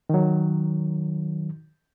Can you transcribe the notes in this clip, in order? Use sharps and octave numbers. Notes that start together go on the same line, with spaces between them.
D#3 F#3